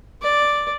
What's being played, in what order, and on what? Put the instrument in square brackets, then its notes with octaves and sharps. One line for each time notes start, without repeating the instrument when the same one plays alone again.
[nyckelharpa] D5